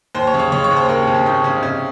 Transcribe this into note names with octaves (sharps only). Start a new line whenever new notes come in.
D#2 C5
C#5
C#3
C#5
C#3 C#5
C#5
D#2
C5
D#2 A#4
C4
D#2
C#4
D#2 D#4
C#3 C#4
C3 C#4